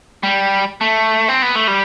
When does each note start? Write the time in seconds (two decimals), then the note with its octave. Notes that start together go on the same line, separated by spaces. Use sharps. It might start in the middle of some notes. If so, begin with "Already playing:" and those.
0.23 G3
0.81 A3
1.29 C4
1.42 B3
1.55 A3
1.68 G3